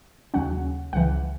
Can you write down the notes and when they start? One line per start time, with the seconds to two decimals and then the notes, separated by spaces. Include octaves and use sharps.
0.34 D#2 C#3 F#3 C#4 F#5
0.93 C#2 C#3 E3 F#5